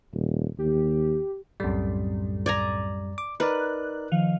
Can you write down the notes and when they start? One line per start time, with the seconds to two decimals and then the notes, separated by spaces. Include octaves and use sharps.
0.13 D#1
0.58 D#2 G4
1.60 C2 F#2 A2 G3
2.46 D5 G#5 A#5
3.18 D6
3.40 D#4 A#4 B4 D5 F#6
4.12 D#3 F3 F5